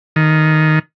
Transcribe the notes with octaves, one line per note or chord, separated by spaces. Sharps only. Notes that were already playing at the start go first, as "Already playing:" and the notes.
D#3